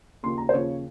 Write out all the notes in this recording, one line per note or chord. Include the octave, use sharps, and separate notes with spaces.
D#2 C#3 F3 C6
A#5
C5
D#2 C#3 F3 C#5